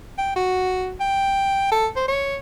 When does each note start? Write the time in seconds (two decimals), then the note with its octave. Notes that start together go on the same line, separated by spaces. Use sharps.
0.18 G5
0.36 F#4
1.00 G5
1.72 A4
1.96 C5
2.08 C#5